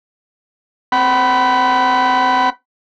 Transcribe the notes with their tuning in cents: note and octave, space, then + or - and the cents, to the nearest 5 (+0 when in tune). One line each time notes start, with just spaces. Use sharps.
C4 -5 F#5 +40 B5 +0